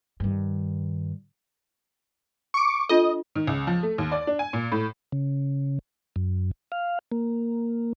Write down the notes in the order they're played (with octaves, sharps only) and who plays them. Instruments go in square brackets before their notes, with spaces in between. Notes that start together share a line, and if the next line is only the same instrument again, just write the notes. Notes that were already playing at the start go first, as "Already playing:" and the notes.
[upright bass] G2 D#3
[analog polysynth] C#6 D6
[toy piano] D4 F4 A4 [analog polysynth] D#5
[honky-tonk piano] D#3
C#2
F3
A3
D#2
D5
D4
G#5
A#2
A2
[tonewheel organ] C#3
F#2
F5
A#3